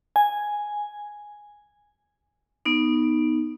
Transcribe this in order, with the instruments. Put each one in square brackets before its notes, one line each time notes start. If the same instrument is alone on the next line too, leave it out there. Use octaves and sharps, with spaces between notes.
[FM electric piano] G#5
[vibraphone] B3 D#4